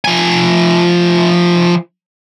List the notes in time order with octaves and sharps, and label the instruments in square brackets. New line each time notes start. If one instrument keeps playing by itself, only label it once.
[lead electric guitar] F3 G#5